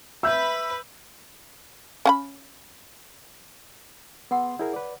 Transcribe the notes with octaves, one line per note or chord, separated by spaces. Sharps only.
B4 E5 B5 E6 G6
C#4 F#5 B5
B3 G#4 F#5 C6 E6
E4 G#4 A#4 C#5
B4 D5